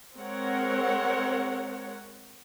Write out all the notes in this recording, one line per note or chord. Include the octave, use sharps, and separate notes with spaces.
G#3 C4 A#4 C#5 F#5